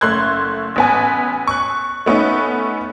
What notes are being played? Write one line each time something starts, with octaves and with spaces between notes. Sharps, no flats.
F#1 A3 C6 F#6 G#6
A1 B3 G#5
C#6 F#6
A3 B3 C#4 D#4